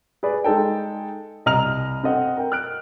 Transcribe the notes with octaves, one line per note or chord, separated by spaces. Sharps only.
G#4 B4 D5
G#3 D#4 A4 G5
C2 D#5 A#5 F6 F7
C4 A4 D#5 F#5
A#4 G5
F6 F#6 D7